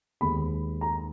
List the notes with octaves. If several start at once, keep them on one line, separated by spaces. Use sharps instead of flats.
D#2 D#3 G#3 B3 B5
A#5